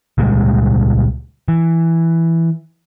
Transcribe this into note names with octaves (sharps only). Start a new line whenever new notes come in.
C#2 A#2 G3 G#3
E3